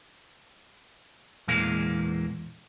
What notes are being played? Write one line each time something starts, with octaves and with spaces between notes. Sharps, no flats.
E2 A#2 E3 G#3 A#3 F5